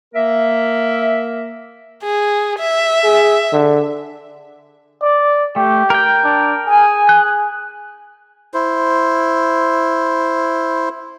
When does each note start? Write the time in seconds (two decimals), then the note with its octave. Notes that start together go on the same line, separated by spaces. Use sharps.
0.14 A#3 A#4 E5
2.03 G#4
2.59 E5
3.04 G#4
3.53 D3
5.02 D5
5.56 A3 G4
5.90 A#4 G5
6.24 D4
6.67 G#4 G#5
7.09 F#6
8.54 E4 C5